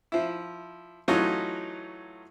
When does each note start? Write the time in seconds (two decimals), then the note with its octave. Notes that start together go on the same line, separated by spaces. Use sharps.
0.12 F3 E4
1.08 E3 F#3 A3 C#4 D#4 F4